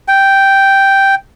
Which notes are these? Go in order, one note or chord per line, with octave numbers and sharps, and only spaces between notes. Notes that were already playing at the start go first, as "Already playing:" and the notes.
G5